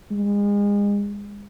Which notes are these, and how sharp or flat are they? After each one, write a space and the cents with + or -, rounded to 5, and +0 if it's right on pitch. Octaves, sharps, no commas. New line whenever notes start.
G#3 -35